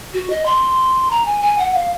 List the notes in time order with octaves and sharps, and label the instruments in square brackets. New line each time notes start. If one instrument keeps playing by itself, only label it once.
[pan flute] F#4
D#5
C6
A#5
G#5
G#5
F#5
F5